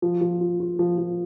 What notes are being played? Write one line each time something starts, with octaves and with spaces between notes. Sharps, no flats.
F3
F3
F4
F4
F3
F3